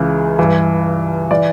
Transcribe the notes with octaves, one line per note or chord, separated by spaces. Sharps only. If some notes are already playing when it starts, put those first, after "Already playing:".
Already playing: C#2 C#3 E3
G2 E3
E3 D5